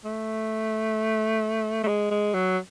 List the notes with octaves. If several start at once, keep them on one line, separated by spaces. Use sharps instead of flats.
A3
A3
G#3
G#3
F#3